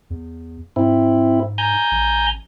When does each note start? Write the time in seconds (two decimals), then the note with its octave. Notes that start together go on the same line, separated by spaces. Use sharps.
0.10 E2
0.76 G#2 C4 E4
1.58 G#5 A#5 G6
1.91 A1